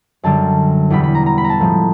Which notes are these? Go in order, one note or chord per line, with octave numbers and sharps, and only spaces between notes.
F#2 D3 G3 A5
E2 B2 G3 B5
B5
A#5
A#5
B5
A#5
A5
A2 F3 G#3